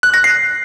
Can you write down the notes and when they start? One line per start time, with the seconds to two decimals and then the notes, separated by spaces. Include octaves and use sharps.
0.03 F#6
0.14 A#6
0.24 C7